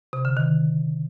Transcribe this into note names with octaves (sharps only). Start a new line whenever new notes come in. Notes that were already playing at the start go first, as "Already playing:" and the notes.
C3
D3
D#3